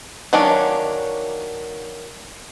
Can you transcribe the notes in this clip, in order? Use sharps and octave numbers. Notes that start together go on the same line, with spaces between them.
D#3 F#3 A#3 C#4 D4